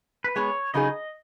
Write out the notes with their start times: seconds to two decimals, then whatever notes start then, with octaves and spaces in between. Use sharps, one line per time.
0.24 B4
0.36 G#3 B3 G#4 C#5
0.74 C#3 F#3 D#4 G#4 D#5